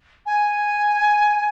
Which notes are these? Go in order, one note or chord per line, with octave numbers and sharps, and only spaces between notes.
G#5